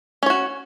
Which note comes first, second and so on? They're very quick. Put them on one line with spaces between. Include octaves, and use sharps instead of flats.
C#4 C#5 F#4